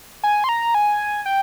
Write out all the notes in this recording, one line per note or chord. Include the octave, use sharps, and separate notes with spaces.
G#5
C6
A#5
G#5
G5